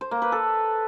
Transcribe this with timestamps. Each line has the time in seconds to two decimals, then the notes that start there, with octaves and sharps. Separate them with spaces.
0.01 C5
0.11 A#3
0.22 B4
0.32 A4